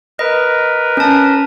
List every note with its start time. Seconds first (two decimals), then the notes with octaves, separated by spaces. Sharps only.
0.19 A#4 B4 D#5
0.97 C#4 A5